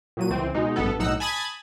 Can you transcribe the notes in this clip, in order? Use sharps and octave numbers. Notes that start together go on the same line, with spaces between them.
A#2 F#3 D#7
C#2 E3 C4
B2 G#3 D#4
A1 G2 B3 A4
B1 A2 D#4 F#5 E6
G#5 A5 B5 D#6 G#6 A6